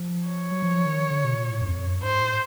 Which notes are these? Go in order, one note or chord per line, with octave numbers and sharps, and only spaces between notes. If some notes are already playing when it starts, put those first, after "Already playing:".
Already playing: F3
C#5
F#3
F3
D#3
D3
B2
A#2
A2
F#2
F2
F#2
G#2 C5
A2